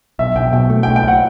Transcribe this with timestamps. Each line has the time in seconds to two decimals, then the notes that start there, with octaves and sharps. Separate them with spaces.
0.19 B1 E5
0.36 B1 G5
0.53 B2 G5
0.70 A3
0.83 G5
0.87 B1
0.96 G5
1.08 F#5